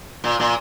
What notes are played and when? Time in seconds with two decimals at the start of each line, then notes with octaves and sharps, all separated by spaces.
0.24 A#2
0.40 A#2